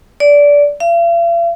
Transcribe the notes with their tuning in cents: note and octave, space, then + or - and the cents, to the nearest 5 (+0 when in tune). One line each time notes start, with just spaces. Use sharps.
D5 -20
F5 -45